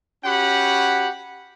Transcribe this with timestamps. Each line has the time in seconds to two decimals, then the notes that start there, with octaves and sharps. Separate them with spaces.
0.24 C#4 F#4 G4 F#5 B5